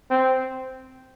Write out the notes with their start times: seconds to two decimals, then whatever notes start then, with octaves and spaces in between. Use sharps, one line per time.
0.10 C4